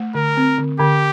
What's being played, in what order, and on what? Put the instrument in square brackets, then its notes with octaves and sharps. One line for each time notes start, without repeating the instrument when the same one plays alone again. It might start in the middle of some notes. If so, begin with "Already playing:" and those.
Already playing: [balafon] A3
[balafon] D3 [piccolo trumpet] A#4
[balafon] C4
D3
[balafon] D3 [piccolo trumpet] G4